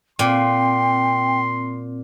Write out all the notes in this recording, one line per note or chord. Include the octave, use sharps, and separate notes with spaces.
A#2 C4 G5 C6